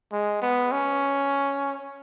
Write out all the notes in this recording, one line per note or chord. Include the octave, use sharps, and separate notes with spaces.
G#3
B3
C#4